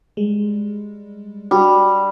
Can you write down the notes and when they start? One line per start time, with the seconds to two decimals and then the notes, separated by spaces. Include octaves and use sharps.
0.17 G3 G#3
1.51 G3 D4 F#4 G4